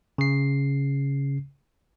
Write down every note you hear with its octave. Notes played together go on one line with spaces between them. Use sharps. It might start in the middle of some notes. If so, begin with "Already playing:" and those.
C#3 C7